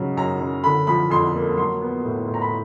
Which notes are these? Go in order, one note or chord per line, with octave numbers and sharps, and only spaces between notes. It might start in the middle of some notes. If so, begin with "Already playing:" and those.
Already playing: G#2 C#3 F#3
F#2 A#5
F#2
D3 B5
F3 B5
F2 C6
A#3
F#3 C6
B3
A2
A2
A#5
B5